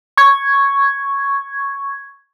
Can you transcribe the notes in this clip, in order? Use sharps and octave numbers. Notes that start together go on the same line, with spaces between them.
C#6 G#6